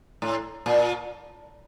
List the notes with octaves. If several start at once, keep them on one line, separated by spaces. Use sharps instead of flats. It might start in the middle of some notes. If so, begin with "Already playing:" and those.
A2
A#2